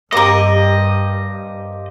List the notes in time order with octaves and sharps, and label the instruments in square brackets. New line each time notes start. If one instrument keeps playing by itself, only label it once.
[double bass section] G2 [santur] A#3 C4 G4 [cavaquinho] A#4 D6 [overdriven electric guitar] D#5